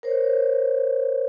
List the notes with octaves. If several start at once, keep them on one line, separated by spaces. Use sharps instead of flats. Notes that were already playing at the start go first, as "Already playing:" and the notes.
A#4 C5 C#5